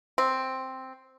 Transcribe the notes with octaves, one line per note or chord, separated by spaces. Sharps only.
C4